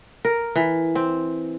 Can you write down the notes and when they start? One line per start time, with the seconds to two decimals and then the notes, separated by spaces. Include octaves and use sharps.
0.25 A#4
0.56 E3
0.95 C4